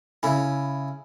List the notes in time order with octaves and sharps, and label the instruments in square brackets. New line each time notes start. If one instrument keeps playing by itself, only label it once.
[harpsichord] C#3 E4 [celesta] G#5 B5